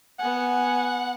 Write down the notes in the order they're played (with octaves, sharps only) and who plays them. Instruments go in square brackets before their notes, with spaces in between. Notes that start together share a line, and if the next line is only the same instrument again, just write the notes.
[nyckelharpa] B3 G#5 [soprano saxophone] F#5